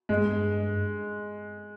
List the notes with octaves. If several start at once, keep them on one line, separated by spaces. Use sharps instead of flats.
G2 G#3